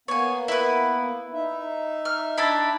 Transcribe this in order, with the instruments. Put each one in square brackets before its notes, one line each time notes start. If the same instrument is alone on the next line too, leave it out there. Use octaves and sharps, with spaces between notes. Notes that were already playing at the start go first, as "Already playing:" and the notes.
[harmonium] A#3 B3 [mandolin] C#5 G#5
[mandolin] E4 B4
[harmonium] D#4 E5
[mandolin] F6
D4 E4 B5